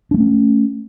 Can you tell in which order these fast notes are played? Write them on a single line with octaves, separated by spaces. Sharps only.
D4 G3 A3 C#4